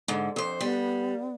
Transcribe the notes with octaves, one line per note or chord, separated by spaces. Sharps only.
G#2 D3
F2 C5
G3 B3